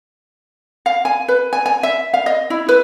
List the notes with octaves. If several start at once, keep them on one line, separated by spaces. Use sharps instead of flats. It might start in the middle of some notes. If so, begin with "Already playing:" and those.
F5
G#5
B4
G#5
G#5
E5
F5
D#5
E4
B4